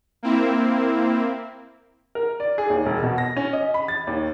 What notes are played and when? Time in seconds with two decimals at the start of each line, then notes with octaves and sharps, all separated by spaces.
0.23 A#3 C4 E4
2.15 A#4
2.40 D5
2.58 G#4
2.70 D#2
2.86 E1
3.03 B2
3.18 A#6
3.37 C#4
3.53 D#5
3.74 B5
3.88 A6
4.07 D#2